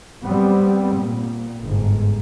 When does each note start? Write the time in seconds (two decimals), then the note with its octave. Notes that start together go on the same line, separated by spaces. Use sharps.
0.25 G3 B3 C4
0.96 A#2
1.63 G1 G#2